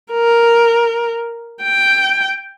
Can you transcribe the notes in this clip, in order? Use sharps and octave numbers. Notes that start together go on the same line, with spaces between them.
A#4
G5